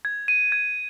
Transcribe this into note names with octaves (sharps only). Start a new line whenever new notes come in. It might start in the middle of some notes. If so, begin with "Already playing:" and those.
G#6
D#7
G#6